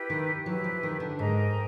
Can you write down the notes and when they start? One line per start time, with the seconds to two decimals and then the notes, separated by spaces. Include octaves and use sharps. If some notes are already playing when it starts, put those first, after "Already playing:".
Already playing: E4 G4 B4
0.10 D#3
0.46 F#3 E4 G4 B4
0.64 F3
0.83 D#3
1.00 D3
1.18 G#2 A#4 D#5 G5 A#5